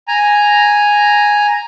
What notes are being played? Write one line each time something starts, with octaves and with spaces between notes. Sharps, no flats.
G#5 A#5